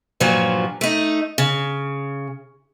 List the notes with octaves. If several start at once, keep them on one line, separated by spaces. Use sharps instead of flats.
G2 A#2 F3 F#3
A3 D#4
C#3